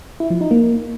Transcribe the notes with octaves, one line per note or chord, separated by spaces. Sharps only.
E4
F3
D#4
A#3